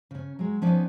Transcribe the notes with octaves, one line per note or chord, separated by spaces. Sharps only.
C#3 C#4
F#3 G#3
F3 B3 C#4 D#4 B4 D5